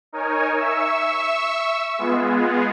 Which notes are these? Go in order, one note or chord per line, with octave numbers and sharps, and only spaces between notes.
D#4 A#4 C#5 G#5
E5 C#6 E6
G#3 B3 F4 G#4